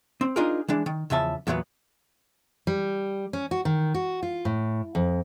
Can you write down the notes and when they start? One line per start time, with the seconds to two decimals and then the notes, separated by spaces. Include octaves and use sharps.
0.21 C4
0.36 D4 D#4 F4 G#4 A#4
0.68 E3 G#3 D4
0.86 D#3
1.10 E2 C#3 F3 E5 A5
1.47 E2 A#2 E3 F#3 B3
2.67 G3
3.33 C#4
3.51 F#4
3.65 D#3
3.94 F#4
4.23 F4
4.45 A2
4.95 F2